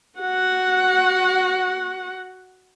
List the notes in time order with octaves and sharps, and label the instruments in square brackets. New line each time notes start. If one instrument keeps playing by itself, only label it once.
[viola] F#4 F#5